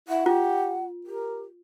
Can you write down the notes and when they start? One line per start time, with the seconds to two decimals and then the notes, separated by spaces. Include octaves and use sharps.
0.08 E4 F#5
0.26 F4 G4
1.06 G4 A#4